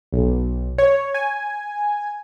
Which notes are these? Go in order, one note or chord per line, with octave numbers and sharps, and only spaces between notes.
B1
C#5
G#5